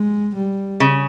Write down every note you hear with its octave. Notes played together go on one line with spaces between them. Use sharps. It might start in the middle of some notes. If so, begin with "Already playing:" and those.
Already playing: G#3
G3
C#3